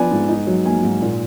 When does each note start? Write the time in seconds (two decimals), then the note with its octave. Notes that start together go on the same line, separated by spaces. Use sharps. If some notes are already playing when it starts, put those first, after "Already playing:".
Already playing: F3 B3 D4 B4 D5 G#5
0.11 G#2
0.28 D#4
0.47 F#3
0.65 A#3 G#5
0.83 G#2
1.01 A#2